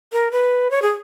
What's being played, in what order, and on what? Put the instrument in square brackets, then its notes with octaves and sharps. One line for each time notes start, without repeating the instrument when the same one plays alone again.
[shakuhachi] A#4
B4
C#5
G#4